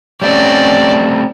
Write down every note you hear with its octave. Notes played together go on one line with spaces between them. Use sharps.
G3 A3 C4 C#4 D5